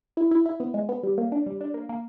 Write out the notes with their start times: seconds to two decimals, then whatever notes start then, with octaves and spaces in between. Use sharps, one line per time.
0.17 E4
0.31 E4
0.46 E4
0.60 B3
0.74 G#3
0.89 B3
1.03 G3
1.18 A#3
1.32 D4
1.46 G3
1.61 D4
1.74 A#3
1.89 A#3